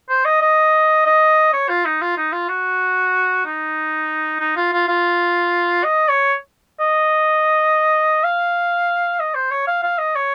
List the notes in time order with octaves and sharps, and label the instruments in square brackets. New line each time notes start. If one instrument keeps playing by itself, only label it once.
[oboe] C5
D#5
D#5
D#5
C#5
F4
D#4
F4
D#4
F4
F#4
D#4
D#4
F4
F4
F4
D#5
C#5
D#5
F5
D#5
C5
C#5
F5
F5
D#5
C#5